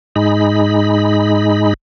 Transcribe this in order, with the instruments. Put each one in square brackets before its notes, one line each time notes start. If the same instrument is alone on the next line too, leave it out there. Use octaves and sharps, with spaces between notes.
[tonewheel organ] G#2 G#3 D#4 B5